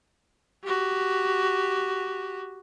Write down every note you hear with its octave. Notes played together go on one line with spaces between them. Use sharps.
F#4 G4